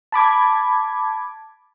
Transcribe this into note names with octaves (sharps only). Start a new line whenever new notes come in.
A5 B5 D6 G#6